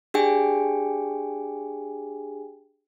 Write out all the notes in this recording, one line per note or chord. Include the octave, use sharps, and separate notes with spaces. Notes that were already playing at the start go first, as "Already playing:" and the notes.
D4 G4 G#4 G5 G#5